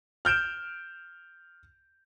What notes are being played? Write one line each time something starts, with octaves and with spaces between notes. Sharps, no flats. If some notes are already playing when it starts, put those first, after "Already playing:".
F6 G6 D7 E7